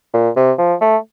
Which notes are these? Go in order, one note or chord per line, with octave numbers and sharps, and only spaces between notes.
A#2
C3
F3
A3